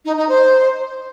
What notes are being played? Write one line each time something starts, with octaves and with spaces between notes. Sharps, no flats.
D#4
D#4
C5